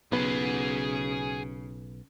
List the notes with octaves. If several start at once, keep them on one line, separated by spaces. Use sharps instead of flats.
B1 C#3 B3 G#4 F#5